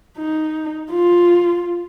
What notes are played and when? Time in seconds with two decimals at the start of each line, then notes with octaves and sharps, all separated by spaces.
0.18 D#4
0.91 F4